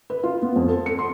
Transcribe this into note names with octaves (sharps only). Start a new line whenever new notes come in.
B4
F4
B3
F2
A4
C#7
C6